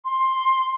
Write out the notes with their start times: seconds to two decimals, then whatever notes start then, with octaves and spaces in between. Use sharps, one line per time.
0.05 C6